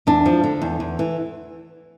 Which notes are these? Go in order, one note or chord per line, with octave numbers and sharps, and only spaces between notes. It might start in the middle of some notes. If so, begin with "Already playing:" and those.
E2 D4
F3
D3
E2
E2
E3